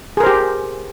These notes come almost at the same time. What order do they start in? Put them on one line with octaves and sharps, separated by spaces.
G#4 A#4 C5 G4